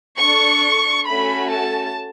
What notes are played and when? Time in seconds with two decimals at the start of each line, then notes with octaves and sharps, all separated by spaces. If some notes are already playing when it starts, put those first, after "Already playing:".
0.20 D4 A4 C#6
1.08 A3 C#4 F#4 A4 B5
1.53 A5